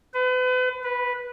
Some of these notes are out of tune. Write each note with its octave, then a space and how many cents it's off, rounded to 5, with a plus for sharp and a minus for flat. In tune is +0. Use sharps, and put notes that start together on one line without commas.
B4 +40
B4 -5